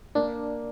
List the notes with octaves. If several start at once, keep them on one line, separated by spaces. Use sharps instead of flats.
A#3 D4